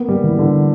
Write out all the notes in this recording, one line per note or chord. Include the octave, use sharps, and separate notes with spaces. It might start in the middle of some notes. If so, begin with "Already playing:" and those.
Already playing: A#3 B3
G3
E3
D3